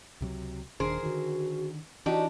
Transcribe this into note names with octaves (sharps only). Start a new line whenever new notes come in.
C#2 C3 F#3
D#1 D#3 D4 G#4 A#4 C5
D3 D#3 F#4
E3 D4 D#4 F#4 G4